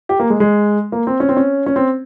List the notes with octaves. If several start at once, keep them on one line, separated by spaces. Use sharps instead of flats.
G4
A#3
G#3
G#3
A#3
C4
C#4
C4
C#4
C#4
C4